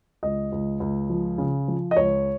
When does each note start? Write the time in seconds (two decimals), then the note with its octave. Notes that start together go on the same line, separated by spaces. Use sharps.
0.23 C#2 D#5
0.52 C#2
0.80 C#2
1.10 F3
1.38 C#3
1.68 F3
1.91 D#5
1.96 C#2 C#5